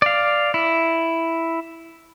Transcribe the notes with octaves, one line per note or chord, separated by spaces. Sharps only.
D5 F5
E4